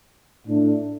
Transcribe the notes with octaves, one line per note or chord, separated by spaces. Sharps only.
A2 A3 D4